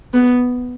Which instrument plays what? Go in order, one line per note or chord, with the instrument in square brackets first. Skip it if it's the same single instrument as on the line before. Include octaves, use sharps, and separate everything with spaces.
[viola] B3